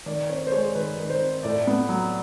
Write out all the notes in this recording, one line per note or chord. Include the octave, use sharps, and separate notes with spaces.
D#3 D5
C4 C#5
C5
G#3 C#5
D#3 B4
D#3
C5
C4
A2 D5
B3
F#3